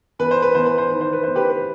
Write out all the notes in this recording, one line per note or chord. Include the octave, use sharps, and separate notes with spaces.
E2 B4
C5
B4
E2 C5
B4
C5
D#3 B4
C5
B4
E2 C5
G4 B4
B4